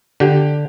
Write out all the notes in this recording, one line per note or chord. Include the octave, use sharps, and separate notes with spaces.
D3 G4